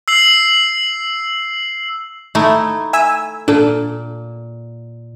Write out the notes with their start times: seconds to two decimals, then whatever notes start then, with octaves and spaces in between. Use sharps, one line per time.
0.08 E6 C7 F#7
2.35 A3 D#4 E4
2.93 E5 G#5 E6
3.48 A#2 D4 A4